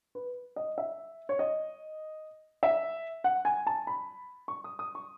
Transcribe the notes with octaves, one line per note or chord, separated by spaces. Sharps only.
B4
D#5
E5
C#5
D#5
E5
F#5
G#5
A5
B5
C#6
D#6
D#6
C#6